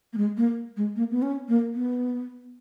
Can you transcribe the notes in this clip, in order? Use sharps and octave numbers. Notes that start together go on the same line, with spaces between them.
A#3
G#3
A#3
G#3
A#3
B3
C#4
A#3
B3